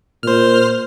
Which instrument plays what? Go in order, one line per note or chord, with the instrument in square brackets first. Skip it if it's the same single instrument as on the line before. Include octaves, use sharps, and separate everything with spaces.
[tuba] A#2 [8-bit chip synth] C5 F6